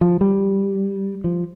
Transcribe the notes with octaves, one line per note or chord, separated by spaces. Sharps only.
F3
G3
F3